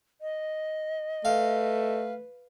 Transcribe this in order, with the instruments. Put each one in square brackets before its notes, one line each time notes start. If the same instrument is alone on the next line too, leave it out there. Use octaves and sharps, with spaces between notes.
[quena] D#5
[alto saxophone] A3 [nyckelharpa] B4 [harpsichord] F5